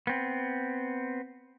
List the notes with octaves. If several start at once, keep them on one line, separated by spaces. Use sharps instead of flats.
B3 C4